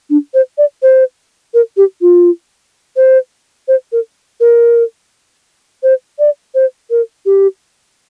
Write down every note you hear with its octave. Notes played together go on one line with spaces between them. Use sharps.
D4
C5
D5
C5
A#4
G4
F4
C5
C5
A#4
A#4
C5
D5
C5
A#4
G4